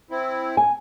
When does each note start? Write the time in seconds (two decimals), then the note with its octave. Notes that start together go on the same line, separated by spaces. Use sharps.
0.11 C4 E4
0.57 G#5